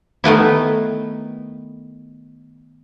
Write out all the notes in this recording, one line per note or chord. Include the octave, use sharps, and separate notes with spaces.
D#3 A3 B3 E4